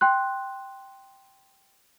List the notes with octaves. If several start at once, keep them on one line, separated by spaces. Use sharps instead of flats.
G5 C6 F#6